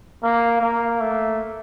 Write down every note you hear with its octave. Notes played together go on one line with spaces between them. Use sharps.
A#3
A#3
A3